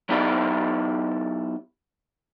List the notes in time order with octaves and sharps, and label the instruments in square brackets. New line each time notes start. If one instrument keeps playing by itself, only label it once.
[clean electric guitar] F#3 B3 D#4 E4 G4 D5